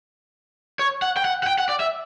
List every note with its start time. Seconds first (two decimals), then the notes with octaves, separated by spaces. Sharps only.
0.79 C#5
1.02 F#5
1.17 G5
1.25 F#5
1.43 F#5
1.47 G5
1.58 F#5
1.69 D5
1.80 E5